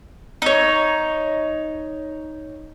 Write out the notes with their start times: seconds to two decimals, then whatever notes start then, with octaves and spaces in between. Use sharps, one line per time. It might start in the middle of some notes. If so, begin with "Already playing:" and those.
0.42 D#4 C#5